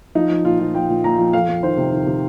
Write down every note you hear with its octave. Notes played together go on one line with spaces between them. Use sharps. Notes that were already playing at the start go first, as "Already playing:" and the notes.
F3 D#4
F3
A#2 F4
F3
F3 G5
A#2
A#2 A#5
F3
F2 F5
F2
D#3 C5
C3
D#3
C3